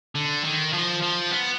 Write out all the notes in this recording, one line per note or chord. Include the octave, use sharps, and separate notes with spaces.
D3
D#3
F3
F3
B3